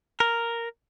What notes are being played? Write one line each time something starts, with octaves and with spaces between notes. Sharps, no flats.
A#4